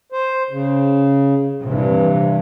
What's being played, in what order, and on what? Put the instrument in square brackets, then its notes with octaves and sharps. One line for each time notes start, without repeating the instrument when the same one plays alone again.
[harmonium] C5
C#3
[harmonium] G2 [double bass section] C3 E3